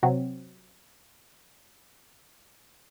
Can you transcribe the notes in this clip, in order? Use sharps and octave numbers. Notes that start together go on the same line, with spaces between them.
C3 F#3 C4